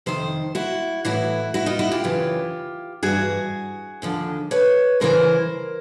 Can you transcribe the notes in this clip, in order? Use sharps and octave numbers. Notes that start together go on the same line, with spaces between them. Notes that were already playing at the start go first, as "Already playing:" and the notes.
F2 C3 D#3 C5
E4 F#4
A2 E3 E4 F#4
E4 F#4
D#4 F4
E4 F#4
F4 G4
F#2 C#3 E3
G2 E3 F#4 G#4
D#2 D3 F3
B4 C#5
F#2 C#3 E3 A#4 C5